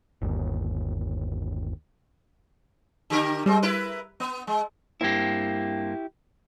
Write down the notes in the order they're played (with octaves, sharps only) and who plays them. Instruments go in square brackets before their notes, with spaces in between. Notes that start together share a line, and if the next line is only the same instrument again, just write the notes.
[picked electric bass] G1 D#2
[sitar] D3 G4 A#4
[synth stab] G3 [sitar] G#3 C4
[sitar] E4 A#4 B4
B3
G#3
[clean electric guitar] G2 A#3 C4 [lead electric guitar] E4 G4